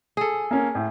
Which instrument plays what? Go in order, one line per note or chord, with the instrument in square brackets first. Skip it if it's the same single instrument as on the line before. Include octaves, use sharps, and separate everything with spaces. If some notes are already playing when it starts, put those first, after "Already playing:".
[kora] G#4 A4
[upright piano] A#3 C#4
A2